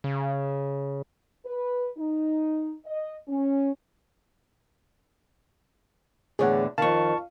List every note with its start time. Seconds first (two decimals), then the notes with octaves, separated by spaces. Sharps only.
0.04 C#3
1.45 B4
1.97 D#4
2.86 D#5
3.28 C#4
6.39 E2 A2 D3 G#4 C#5 F#5
6.78 F2 D#3 F5 A5 C#6